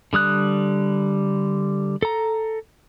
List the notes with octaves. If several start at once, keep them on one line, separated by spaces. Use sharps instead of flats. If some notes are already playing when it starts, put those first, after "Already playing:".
D3 G3 D#6 F#6
A4 A#5